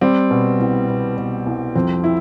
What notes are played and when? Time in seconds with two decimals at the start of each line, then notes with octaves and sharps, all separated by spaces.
0.01 G3 C4
0.31 B2
0.60 C2
0.89 B2
1.17 B2
1.46 C2
1.75 F2 C4
2.04 E4